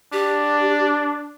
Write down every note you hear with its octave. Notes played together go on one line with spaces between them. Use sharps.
D4 G4